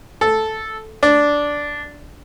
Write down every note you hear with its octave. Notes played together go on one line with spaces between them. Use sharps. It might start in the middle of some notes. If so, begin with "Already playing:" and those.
A4
D4